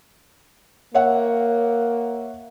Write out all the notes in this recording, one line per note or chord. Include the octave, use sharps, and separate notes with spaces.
A#3 C#5 E5 F#5